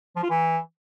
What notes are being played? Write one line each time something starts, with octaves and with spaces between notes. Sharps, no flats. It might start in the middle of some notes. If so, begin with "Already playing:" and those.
F3
F4
E3